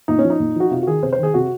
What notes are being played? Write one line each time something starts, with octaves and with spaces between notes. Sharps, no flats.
A#2 D#4
C#4
F3
D#4
A#2
F3 F#4
C3 F4
F#4
D#3 G#4
C3 C5
C5
D#3 G#4
C3 F#4